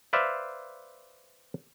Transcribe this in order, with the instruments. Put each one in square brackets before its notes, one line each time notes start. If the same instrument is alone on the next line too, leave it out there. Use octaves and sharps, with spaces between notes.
[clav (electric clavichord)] B4 C5 D5 E5 F5